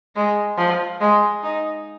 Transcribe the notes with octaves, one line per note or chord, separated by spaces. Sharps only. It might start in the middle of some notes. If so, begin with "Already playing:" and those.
G#3
F3
G#3
D#4